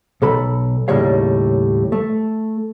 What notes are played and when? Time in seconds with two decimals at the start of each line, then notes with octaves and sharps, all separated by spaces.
0.22 B1 A4 B5
0.88 D#2 A2 C#3 G3 C#5 F5
1.92 A3